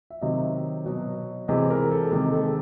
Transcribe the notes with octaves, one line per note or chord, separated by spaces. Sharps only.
E5
C3 D#3 F#3 D#5
B2 F#3
C3 E3 G#3 D#5
A#4
A4
C3 D#3 G#3 G#4
A4